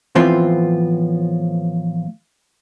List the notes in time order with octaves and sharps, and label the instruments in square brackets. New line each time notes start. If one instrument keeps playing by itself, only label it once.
[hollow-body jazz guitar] A2 E3 F3 B3 C4 F4